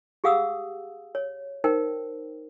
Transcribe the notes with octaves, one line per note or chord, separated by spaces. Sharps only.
G4 G#4 F5 F#5 D#6 E6
C#5
D#4 A#4 C5 G5